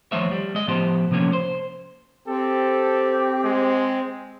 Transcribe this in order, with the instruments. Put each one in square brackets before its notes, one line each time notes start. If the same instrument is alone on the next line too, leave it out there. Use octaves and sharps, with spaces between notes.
[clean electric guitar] D#2 F3 A3 C5 C#5 E5
G3
G#3 D#5
A2 F3 B3 E4 G4 C5
C3 F3 A3 A#3 C#4
C5
[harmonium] C4 [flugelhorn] G4 [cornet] A4
[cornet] G#3